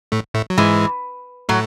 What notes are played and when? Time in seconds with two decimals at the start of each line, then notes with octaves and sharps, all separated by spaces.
0.12 A2 A3
0.34 A2 A3
0.50 F#3
0.58 G#2 E3 G#3
1.49 A2 F#3 A3